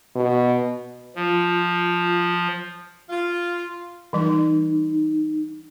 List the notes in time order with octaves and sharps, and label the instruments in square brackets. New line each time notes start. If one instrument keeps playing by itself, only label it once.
[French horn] B2
[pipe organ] F3 [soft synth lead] F4
[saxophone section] F4
[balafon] E3 G3 [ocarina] D#4